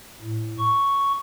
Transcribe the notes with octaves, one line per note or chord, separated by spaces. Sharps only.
A2
C#6